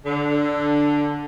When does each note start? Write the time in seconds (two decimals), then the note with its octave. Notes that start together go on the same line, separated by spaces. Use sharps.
0.05 D3